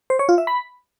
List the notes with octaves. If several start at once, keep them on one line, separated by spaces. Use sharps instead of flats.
C5
C#5
F4
E5
B5